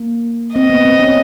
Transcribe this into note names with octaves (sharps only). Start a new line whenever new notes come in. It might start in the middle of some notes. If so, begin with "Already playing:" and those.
Already playing: A#3
C4 D#5
B3
C4
C#4